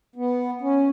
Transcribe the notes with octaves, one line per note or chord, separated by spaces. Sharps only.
B3
C#4